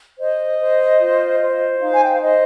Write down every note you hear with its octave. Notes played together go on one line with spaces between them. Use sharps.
C5 D#5
C5
F4
C5
D#4 F5
G#5
G5
F5
C5 D#5